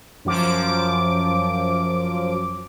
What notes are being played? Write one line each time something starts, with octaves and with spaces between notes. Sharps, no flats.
F#2 F3 D6